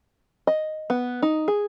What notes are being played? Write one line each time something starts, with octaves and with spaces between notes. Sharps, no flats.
D#5
B3
D#4
G#4